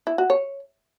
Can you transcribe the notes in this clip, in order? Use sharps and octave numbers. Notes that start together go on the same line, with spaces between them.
E4
F#4
C#5